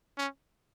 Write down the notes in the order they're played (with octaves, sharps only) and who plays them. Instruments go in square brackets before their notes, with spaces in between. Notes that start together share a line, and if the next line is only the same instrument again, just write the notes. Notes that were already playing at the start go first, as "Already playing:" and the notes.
[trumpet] C#4